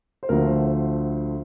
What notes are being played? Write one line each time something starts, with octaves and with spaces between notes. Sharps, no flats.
C5
D2 D3 F3 A3 A#4
C5
C5